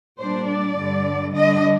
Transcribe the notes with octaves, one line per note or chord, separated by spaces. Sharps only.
A#2 G3 D4 C5
D5
G2 D3 G3
D3 G3 D4 D#5